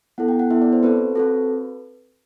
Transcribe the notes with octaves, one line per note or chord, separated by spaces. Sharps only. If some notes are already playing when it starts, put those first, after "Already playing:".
B3 E4 A4 F#5
G5
F#5
B3 E4 A4 E5
D5
C5
C4 F#4 A4 B4
C4 F#4 A4